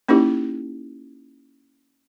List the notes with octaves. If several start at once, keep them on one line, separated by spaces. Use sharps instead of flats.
A#3 C#4 D#4 E4 G4